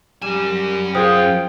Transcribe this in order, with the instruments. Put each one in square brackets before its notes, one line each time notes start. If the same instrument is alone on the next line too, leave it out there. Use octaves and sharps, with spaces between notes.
[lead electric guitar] F#2 G#5 [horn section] G3 [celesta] E7
[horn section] F4 G#4 [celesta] C5 D#6 [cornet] G5